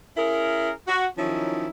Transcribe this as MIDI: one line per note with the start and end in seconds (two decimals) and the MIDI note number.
0.17 0.70 61
0.17 0.70 64
0.17 0.70 68
0.17 0.70 70
0.87 1.07 66
1.18 1.68 51
1.18 1.68 53
1.18 1.68 54
1.18 1.68 61
1.18 1.68 63
1.18 1.68 64